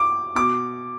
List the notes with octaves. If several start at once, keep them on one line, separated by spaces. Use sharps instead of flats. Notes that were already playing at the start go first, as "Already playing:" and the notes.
Already playing: D6
B2 D6